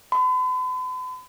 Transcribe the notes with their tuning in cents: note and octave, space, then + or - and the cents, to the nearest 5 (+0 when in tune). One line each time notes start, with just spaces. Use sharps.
B5 +45